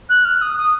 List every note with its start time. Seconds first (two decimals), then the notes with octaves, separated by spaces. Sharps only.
0.09 F#6
0.25 F6
0.41 D#6
0.57 D#6